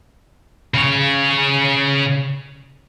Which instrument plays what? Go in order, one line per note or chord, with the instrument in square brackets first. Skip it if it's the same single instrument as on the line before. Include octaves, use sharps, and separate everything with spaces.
[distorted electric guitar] C#3 C#5